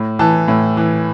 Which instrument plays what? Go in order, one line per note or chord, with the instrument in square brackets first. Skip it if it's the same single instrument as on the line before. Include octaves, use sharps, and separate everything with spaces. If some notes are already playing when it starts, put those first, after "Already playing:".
Already playing: [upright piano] A2
E3 A5
A2
E3